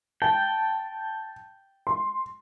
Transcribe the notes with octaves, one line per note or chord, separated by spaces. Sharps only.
G5 A5
C6